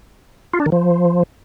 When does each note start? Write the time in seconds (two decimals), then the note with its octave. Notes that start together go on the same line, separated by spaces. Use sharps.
0.53 F4
0.60 D4
0.66 D#3
0.72 F3